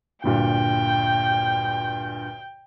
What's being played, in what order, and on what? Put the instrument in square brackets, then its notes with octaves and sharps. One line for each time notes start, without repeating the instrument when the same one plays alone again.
[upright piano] D2 G2 A#2 [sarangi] G5